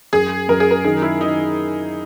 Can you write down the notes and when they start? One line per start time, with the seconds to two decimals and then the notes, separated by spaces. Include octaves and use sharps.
0.13 F#2 G#4
0.49 F#2 A#4
0.60 G#4
0.71 A#4
0.84 D#3 G#4
1.02 E4
1.21 D#3 D#4